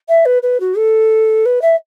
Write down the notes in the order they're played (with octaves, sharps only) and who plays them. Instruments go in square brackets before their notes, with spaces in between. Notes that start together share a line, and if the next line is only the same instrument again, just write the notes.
[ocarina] E5
B4
B4
F#4
A4
B4
E5